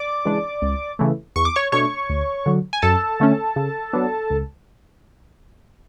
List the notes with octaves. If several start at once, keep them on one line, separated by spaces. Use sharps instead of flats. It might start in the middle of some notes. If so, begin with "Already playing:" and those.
Already playing: D5 D6
C#3 E3 G#3 D4
C#2
C#3 E3 A3
E2 C#6
D6
C#5 C#6
B2 A3 D4 C#5 C#6
D2
D3 F#3
G#5
F#2 A4 A5
D3 A3 C#4
C#3
F#3 B3 D4
C#2